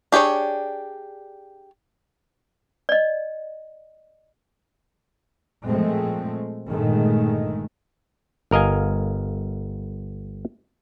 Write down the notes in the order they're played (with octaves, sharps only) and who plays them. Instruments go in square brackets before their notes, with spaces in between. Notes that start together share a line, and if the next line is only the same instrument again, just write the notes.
[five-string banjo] D4 G4 G#4 C#5
[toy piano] D5 D#5
[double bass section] A#2 F3 G#3 A3 C4
G1 A#2 D#3 G#3 A3
[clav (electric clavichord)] G1 A#4 D#5 F5 G#5